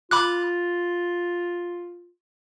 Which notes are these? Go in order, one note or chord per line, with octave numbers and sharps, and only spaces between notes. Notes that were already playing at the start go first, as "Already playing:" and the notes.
F4 B5 D6 F#6